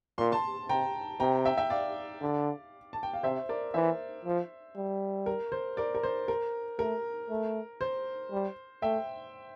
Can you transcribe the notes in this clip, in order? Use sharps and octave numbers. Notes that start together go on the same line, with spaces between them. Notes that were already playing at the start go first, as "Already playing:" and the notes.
A#2 C6
A5 C6
C3 G5 A#5
C3 G5 A#5
E5 G5
E5 G5
D5 F5
D3
A5
G5
F5
C3 C5 E5
A#4 D5
E3 C5 E5
F3
G3
A#4
C5
A#4 D5
A#4
C5
A#4
A3 A#4
A3
C5
G3
A3 E5 G5